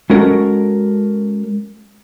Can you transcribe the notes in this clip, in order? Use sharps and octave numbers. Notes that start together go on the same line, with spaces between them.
G#3 C#4 F#4 A4 A#4